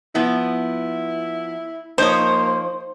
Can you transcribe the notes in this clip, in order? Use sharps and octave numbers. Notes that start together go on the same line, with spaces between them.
F3 B3 E4
F3 A#3 D#4 C5 C#5